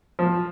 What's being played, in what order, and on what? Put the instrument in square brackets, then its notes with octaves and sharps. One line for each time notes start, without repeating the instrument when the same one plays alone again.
[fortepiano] F3